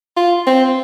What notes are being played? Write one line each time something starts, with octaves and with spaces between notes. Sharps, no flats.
F4
C4